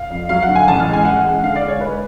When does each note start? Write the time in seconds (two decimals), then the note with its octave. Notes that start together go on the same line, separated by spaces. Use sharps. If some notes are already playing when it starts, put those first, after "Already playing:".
Already playing: F5
0.10 F2
0.29 F#3 F5
0.43 F#5
0.48 D3
0.56 G#5
0.68 A1 A5
0.80 F6
0.87 G#3
0.93 G#5
1.05 A1 F#5
1.25 G#3
1.43 D3 F5
1.56 D5
1.62 G#3
1.68 C#5
1.81 G#3 B4